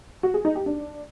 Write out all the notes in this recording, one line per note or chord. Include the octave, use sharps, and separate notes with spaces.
F#4
G#4
D#4
G4
D4